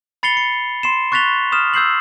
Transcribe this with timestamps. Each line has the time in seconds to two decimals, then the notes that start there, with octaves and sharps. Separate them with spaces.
0.23 B5 A6 C7 C#7 F7 G7
0.37 C#7
0.83 C6 C7 E7
1.12 C#6 F#6 A6 B6 F7 G7
1.52 D#6 F6 E7
1.74 E6 G6 C7 F#7